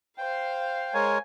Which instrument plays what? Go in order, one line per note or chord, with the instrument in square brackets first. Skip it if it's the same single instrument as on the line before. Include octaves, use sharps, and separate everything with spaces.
[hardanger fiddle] C5 F5 [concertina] G5
[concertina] G#3 A#4 C#5 [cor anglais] G#5